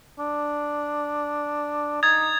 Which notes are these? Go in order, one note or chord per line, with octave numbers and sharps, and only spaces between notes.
D4
D#4 D#6 G#6 A6